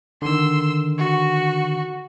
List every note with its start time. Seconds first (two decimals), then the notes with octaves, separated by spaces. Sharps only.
0.22 D3 D#3 C6 E6
0.98 F#4